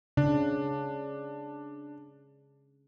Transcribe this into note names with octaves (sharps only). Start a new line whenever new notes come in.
C#3 D4